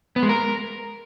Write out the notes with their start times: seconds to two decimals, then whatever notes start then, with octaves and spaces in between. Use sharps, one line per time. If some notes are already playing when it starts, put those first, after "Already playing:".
0.16 B3
0.23 G#3
0.29 A#4